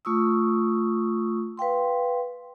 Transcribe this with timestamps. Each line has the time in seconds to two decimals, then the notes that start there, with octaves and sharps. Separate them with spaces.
0.05 A3 F4 C#6 D#6 E6
1.57 B4 F5 G5 C6